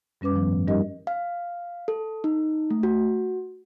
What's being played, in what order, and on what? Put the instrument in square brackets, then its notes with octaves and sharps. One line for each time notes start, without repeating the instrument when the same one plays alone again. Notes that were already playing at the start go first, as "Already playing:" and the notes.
[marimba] F#2 G3 C#4 B4 D6
D#3 F3 B3
G#2
G3 C#4 D#4 G4 A#4 D#5
[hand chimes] F5
A4
D#4
A3
F#4